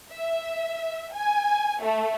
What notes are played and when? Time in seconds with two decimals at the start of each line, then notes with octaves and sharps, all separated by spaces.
0.11 E5
1.13 G#5
1.82 A3